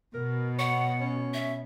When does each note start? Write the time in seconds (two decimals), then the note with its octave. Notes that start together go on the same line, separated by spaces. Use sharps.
0.14 B2 A#4
0.59 C#5 F#5
1.01 C#4
1.34 E5